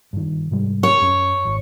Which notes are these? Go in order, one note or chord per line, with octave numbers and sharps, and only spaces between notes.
G2 D#3
G#2 C3 G3
C#5
F#2 C#4
G#1